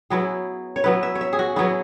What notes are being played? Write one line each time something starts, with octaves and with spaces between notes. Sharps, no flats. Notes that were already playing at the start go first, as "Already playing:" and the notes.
F#3 B3 E4 G#4
C#5
F#3 B3 E4 B4
E5
C#5
E5
G#4
F#4
F#3 B3 E4 G#4